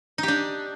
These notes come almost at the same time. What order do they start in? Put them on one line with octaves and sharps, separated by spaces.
D#4 G4 D4